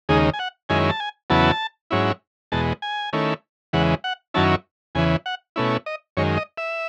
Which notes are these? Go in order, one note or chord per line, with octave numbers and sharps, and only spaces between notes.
D#2 C#3 G#3 D#4 G#4
G#5
F#5
F#2 D#3 G#3 C#4 E4 G#5
A5
G#5
E2 C#3 F#3 B3 E4 A5
G#2 F#3 C#4 E4
E2 B2 G#3 A5
G#5
D#3 A3 C#4 E4
E2 C#3 E3 G#3 F#5
F#5
F#2 D#3 F#3 C#4 E4 A5
E2 C#3 E3 G#5
F#5
B2 A3 C#4 E4
D#5
F#2 D#3 G#3 C#5
D#5
E5